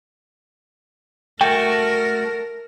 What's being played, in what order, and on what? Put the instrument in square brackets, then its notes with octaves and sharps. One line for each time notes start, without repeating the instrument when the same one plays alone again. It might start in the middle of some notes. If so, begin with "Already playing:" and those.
[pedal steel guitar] A3 F#4 [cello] A#4 [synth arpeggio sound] G5